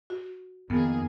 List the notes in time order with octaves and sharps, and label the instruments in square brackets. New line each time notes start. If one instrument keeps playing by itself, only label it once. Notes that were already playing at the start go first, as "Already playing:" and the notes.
[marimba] F#4
[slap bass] F2 [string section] D#3 A#3 G#4 [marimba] B3